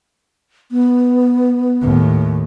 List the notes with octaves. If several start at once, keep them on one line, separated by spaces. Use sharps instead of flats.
B3
D#2 A2